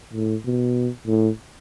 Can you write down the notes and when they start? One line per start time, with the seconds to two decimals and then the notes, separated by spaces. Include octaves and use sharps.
0.13 A2
0.45 B2
1.07 A2